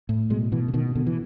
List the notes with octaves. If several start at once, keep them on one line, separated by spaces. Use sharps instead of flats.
A2
B2 G#3
B2 E3
D3
B2 D#3
B2 D3
E3